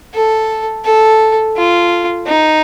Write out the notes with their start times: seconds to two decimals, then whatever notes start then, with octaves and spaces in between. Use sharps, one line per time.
0.14 A4
0.85 A4
1.56 F4
2.26 D#4